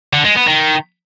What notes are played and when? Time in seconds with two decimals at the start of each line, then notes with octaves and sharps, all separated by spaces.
0.13 D3
0.25 G#3
0.36 B3
0.47 D#3